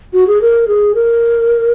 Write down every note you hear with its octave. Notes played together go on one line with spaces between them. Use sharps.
F#4
G#4
A#4
G#4
A#4